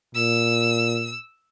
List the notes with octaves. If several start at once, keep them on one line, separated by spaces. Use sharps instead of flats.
A#2 E6